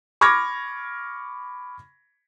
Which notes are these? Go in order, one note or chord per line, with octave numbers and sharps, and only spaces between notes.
B5 C#6 D6 F6 G#6 A#6